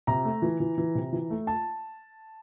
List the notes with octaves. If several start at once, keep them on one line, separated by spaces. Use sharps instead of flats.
C3 A#5
A3
E3
E3
E3
C3
E3
A3
A5